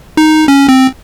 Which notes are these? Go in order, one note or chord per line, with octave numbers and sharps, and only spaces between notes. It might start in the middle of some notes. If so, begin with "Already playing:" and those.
D#4
C#4
C4